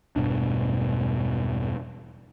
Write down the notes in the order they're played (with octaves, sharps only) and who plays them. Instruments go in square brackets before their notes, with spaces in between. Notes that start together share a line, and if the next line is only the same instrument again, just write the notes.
[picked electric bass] E1 G2 B2 D4